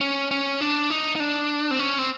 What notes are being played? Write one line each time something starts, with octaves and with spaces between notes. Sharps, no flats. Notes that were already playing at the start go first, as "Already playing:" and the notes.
C#4
C#4
D4
D#4
D#4
D4
C4
C#4
C4